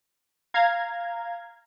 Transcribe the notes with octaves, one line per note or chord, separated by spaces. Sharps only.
F5 A#5 G#6